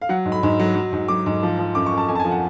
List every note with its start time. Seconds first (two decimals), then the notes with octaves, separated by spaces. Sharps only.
0.02 F5
0.09 F#3 F#5
0.26 G#2
0.32 B5
0.43 G#2
0.60 F#3
0.75 F#3
0.93 G#2
1.08 F#3 D6
1.26 G#2
1.43 F3
1.59 F3
1.75 F#2 D6
1.86 C#6
1.92 F#2
1.98 A5
2.09 F2 G#5
2.15 A5
2.20 G#5
2.25 F3
2.31 F#5